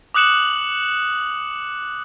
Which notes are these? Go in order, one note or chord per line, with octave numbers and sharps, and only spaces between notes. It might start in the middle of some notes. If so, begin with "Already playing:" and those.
D6 D#6 F#6 C#7 E7 F#7